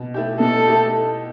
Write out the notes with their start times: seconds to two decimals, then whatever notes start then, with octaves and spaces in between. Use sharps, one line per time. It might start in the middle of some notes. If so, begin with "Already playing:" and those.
Already playing: B2
0.14 A3 E4 G4
0.40 B2 A4
0.67 A3 E4 G4